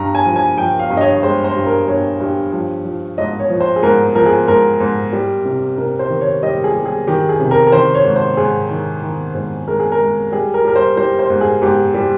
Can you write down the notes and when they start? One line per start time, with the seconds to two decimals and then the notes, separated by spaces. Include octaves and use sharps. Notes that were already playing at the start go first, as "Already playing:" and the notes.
Already playing: G2 A#5
0.15 G#5
0.26 F3
0.36 G#5
0.58 F3 G5
0.79 F5
0.90 G2
0.97 D#5
1.01 C#5
1.23 G#3 C5
1.44 C5
1.56 G2
1.66 A#4
1.88 G2 C#5
2.20 G2
2.53 F3
2.85 F3
3.18 G#2 D#5
3.40 C#5
3.50 F3
3.61 C5
3.76 G#4
3.83 G#2 A#4
4.15 F3 A#4
4.26 G#4
4.48 G#2 A#4
4.80 G#2
5.13 G3
5.45 C3
5.78 C3 A#4
5.99 C5
6.10 D#3
6.21 C#5
6.43 G3 D#5
6.64 G#4
6.75 G3
6.85 G#4
7.07 D#3 G4
7.29 G#4
7.40 C3
7.51 A#4
7.67 A#4
7.72 D#3 C5
7.95 C#5
8.05 G#2
8.16 C5
8.37 G#2 G#4
8.70 D#3
9.02 D#3
9.35 G#2
9.67 G#3 A#4
9.80 G#4
9.92 A#4
10.00 G#3
10.32 G3 G#4
10.54 A#4
10.65 G3 A#4
10.76 C5
10.97 G3 C5
11.19 C5
11.30 G#2
11.41 G#4
11.62 G#2 G4
11.94 G3